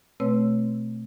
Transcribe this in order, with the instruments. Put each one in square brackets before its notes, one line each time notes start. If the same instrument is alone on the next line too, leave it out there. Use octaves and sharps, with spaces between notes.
[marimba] B2 A3 C4 B4 C#5 E6